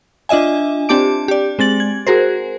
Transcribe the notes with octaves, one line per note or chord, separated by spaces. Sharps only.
D4 F4 D#5 E5 G#5
C4 D4 G4 A5 D6 D7
G4 D5
G#3 C4 A6 F#7
G#6
F#4 G#4 A#4 C5